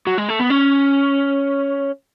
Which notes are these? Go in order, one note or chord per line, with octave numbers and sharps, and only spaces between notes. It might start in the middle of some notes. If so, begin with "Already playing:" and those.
F#3
G#3
A3
B3
C#4